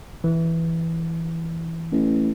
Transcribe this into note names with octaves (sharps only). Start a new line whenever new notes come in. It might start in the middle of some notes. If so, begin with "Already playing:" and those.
E3
A1